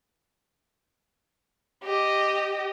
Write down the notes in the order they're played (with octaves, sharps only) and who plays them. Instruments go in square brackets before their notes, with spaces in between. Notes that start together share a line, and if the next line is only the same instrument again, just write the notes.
[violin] G4 D#5